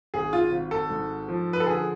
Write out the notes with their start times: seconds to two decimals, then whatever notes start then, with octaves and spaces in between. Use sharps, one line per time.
0.14 G#1 G#4
0.33 F4
0.52 G#1
0.71 A4
0.90 G#2
1.28 F3
1.53 B4
1.60 A4
1.66 D3 G#4